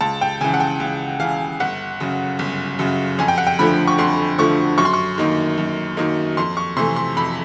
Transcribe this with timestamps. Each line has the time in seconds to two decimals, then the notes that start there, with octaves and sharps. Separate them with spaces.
0.01 C#2 A5
0.21 G5
0.41 C#3 E3 G#5
0.54 F#5
0.60 G5
0.80 C#2
1.20 C#3 E3 F5
1.60 G1 F#5
2.00 F#2 C#3
2.39 G1
2.79 F#2 C#3
3.19 F2 G#5
3.28 G5
3.38 F#5
3.47 G5
3.59 D3 F3 A3 B5
3.88 C#6
3.98 F2 C6
4.38 D3 F3 A3 C#6
4.78 F#2 C#6
4.85 C6
4.93 C#6
5.18 D#3 F#3 A#3 D#4
5.58 F#2
5.97 D#3 F#3 A#3 D#4
6.37 F2 C6
6.57 C#6
6.77 C3 E3 A3 C6
6.96 C6
7.17 F2 B5